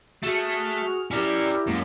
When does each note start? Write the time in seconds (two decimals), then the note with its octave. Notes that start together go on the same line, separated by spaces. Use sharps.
0.23 A3 F#4 G#4 F6
1.11 C#4 E4 G4 A#4 D5 A#5 F6
1.67 F#2 G#3 A#3